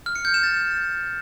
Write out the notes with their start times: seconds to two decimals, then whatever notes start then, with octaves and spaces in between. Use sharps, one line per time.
0.06 F6
0.16 C#7
0.25 G6
0.34 E7
0.43 A6